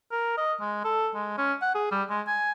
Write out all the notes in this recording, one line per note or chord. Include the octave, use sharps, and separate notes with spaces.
A#4
D#5
G#3
A4
G#3
C#4
F#5
G#4
G3
G#3
G#5